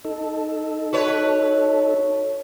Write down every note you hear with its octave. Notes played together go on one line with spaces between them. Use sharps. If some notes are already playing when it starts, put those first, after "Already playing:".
D#4 A4
F#4 B4 C#5